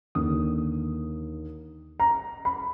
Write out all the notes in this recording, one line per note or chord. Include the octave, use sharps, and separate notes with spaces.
D#2 D3 D#6
A#5
B5